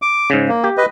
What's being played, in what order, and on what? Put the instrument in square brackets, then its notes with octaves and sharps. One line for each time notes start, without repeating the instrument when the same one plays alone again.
[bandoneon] D6
[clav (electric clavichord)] G#2 C#3
[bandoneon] A#3
[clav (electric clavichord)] G4
[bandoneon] B4 D#5